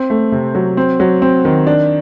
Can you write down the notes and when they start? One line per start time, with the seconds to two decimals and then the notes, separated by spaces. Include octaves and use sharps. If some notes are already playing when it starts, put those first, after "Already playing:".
Already playing: C4
0.10 A3
0.32 C3
0.55 F#3
0.77 C4
1.00 F#3
1.22 C4
1.45 D#3
1.67 D4